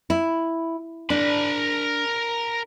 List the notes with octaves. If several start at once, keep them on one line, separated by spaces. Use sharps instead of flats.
E4
D4 A#4 B5